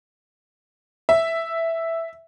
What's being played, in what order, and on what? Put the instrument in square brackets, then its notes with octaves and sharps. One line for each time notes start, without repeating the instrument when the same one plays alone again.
[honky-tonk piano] E5